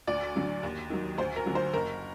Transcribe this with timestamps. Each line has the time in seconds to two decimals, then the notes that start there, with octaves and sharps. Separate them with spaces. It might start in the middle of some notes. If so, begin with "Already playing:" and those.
0.07 D2 D5
0.36 D3 F#3
0.63 D#2
0.90 D#3 F#3
1.18 D2 C5
1.36 A#4
1.46 D3 F#3
1.55 C5
1.74 F#1 A#4